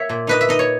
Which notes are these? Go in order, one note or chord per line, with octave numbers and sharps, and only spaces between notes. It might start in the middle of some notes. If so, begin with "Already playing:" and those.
Already playing: A#3 C#5 E5
A#2
D#4 B4 D#5
E5
D#4 D#5
C#5